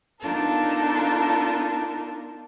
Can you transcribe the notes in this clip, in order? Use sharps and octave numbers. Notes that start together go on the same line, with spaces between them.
B3 D4 D#4 F4 A4 A#4